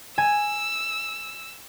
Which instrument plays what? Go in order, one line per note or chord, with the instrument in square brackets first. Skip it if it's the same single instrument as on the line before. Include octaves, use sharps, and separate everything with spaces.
[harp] G#5 [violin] E6